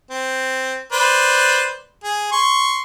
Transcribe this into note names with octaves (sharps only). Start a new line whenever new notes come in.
C4
B4 C5 D5
G#4
C6 C#6